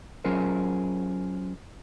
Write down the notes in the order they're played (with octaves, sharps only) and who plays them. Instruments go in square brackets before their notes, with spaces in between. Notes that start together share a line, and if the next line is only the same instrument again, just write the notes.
[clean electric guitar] F#3 C#4 F4 G#4 A#4 C5